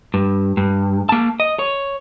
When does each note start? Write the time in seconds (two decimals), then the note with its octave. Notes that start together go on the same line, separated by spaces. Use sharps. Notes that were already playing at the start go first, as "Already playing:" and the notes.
0.14 G2
0.57 G2
1.09 A#3 A5
1.40 D#5
1.59 C#5